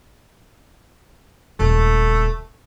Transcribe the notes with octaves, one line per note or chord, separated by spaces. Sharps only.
D#1 C#2 A3